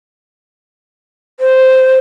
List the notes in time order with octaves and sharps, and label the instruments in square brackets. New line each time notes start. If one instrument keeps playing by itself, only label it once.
[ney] C5